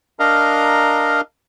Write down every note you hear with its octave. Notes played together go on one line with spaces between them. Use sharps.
D4 A#4 D#5 F5 A#5